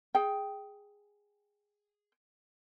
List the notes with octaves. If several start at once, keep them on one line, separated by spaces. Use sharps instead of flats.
G#4 G5